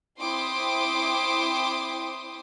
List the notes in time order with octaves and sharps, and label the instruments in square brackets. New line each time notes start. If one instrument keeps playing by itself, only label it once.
[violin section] C4 E4 G5 C6 D6 D#6